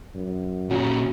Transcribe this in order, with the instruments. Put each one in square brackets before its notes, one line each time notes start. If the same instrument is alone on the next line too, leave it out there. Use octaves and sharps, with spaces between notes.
[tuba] F#2
[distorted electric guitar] A#2 C#4 [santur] F#3 A#5